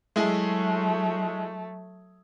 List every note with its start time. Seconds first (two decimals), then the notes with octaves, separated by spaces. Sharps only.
0.16 F#3 G#3 A3 E4 G#4